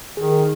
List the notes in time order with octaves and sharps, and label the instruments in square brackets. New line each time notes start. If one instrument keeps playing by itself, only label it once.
[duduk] D#3 [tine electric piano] G#4